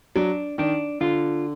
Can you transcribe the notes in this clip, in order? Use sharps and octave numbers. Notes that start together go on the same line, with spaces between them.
F#3 D4
D#3 D4
D3 F4